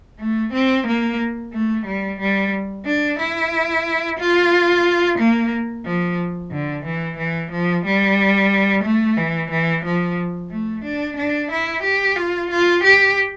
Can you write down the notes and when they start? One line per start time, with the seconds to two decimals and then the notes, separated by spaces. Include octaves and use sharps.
0.20 A3
0.53 C4
0.87 A#3
1.53 A3
1.86 G3
2.20 G3
2.86 D4
3.19 E4
4.19 F4
5.19 A#3
5.86 F3
6.52 D3
6.85 E3
7.18 E3
7.51 F3
7.85 G3
8.84 A3
9.17 E3
9.51 E3
9.85 F3
10.50 A3
10.84 D4
11.17 D4
11.51 E4
11.83 G4
12.16 F4
12.51 F4
12.84 G4